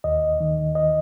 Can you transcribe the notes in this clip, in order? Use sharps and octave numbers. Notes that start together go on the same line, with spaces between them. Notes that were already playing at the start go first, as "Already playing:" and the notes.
D#2 D#5
D#3
D#5